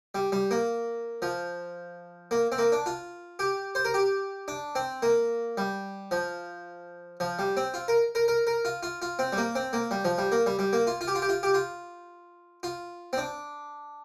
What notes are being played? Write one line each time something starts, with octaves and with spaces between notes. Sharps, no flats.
G3
G3
A#3
F3
A#3
C4
A#3
D4
F4
G4
C5
A#4
G4
D4
C4
A#3
G3
F3
F3
G3
C4
F4
A#4
A#4
A#4
A#4
F4
F4
F4
C4
G3
A#3
C4
A#3
G3
F3
G3
A#3
G3
G3
A#3
F4
F4
G4
F4
G4
F4
G4
F4
F4
C4
D4